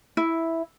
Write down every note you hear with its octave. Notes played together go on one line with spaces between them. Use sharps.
E4